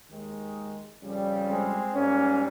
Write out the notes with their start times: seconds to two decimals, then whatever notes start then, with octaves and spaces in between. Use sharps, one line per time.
0.09 D#2 D#3 G#3
1.02 F2 C#3 G3
1.48 G#3 C4
1.94 G#2 G3 A#3 C#4